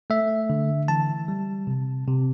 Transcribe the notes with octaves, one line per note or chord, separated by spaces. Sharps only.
A3 E5
D3
E3 A5
G3
C3
C3